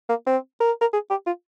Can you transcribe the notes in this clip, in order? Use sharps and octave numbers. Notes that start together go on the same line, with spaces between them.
A#3
C4
A#4
A#4
G#4
G4
F4